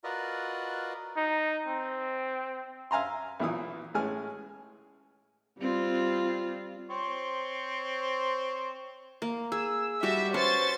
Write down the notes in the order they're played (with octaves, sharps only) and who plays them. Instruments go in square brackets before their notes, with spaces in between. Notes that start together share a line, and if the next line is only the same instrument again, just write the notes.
[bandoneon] F4 F#4 A#4 B4 D5 D#5
[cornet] D#4
C4
[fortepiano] E5 F5 G#5 A#5 C6
B1 A#2 E3 D#6
A2 G#3 C#4 G#4 G#5 F6
[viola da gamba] G3 C4 F4
[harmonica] C4 C5 C#5
[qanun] A#3
[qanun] G#4 [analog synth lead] E6
[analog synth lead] G3 [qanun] F#4 G4 A5 [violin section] E5
[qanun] C#4 B4 [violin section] C5 A6 [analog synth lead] C#6